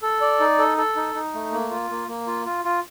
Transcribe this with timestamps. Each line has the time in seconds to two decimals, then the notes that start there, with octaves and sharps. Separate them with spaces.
0.02 A4
0.21 D5
0.40 D#4
0.59 A4
0.78 A4
0.96 D#4
1.15 D#4
1.34 A3
1.52 A#3
1.71 F4
1.90 A#3
2.08 A#3
2.27 F4
2.46 F4
2.65 F4